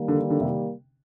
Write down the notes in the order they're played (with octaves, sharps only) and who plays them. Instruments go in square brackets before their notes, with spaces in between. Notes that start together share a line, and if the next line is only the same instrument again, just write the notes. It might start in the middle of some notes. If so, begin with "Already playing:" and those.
Already playing: [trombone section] D#3 G3 A#3
[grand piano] D3
D3
C3